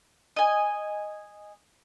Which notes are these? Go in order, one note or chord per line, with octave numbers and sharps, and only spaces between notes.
D#5 G#5